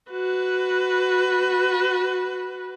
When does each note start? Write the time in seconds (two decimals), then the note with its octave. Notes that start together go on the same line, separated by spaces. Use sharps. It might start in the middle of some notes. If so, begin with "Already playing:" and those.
0.10 F#4 B4